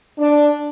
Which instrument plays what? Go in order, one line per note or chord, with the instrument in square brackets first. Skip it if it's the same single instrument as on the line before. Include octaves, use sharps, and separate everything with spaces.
[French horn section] D4